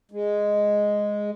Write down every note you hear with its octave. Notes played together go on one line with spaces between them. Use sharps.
G#3